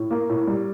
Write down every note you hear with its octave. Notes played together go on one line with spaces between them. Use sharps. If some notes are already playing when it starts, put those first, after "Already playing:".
Already playing: A2
A#3
A2
G3